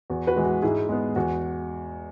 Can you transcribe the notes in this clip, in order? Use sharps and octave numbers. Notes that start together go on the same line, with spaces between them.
E2 F#4
F#4 B4
E3 G#3
F#4
G#2 E4 G#4
G#3 B3
E2 F#4